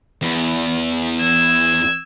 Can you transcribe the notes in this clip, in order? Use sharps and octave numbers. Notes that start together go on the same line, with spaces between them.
E2
E6 G#6